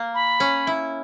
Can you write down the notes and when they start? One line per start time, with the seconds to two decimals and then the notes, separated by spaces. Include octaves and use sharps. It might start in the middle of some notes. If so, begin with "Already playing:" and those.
Already playing: A#3
0.14 B5
0.40 C#4
0.67 E4